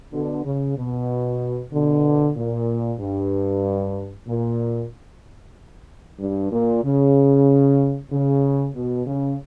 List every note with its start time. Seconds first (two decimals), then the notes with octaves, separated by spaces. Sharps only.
0.11 B2 D3
0.44 C#3
0.76 B2
1.72 B2 D3
2.35 A#2
2.99 G2
4.27 A#2
6.19 G2
6.51 A#2
6.83 C#3
8.11 C#3
8.74 B2
9.06 C#3